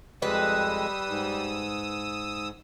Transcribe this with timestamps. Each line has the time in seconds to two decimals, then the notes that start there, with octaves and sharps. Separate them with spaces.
0.22 F2 G3 G#3 B4 D#6 E6
1.08 G#2